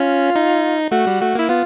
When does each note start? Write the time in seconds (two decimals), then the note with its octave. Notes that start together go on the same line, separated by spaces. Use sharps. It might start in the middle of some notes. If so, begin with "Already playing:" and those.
Already playing: C#4 F4
0.36 D#4
0.92 A3 F#4
1.07 G3
1.21 A3 F#4
1.35 A#3 E4
1.49 B3 F4